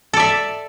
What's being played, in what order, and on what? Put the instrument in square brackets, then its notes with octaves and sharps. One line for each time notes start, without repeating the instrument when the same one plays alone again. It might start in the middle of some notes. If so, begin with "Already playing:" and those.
[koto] A4
D5
E5